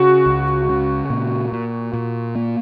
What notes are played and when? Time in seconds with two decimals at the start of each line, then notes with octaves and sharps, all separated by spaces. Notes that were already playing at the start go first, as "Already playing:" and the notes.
Already playing: C#3 F#4
0.26 C#2
0.69 C#3
1.10 A#2
1.52 A#2
1.93 A#2
2.35 A#3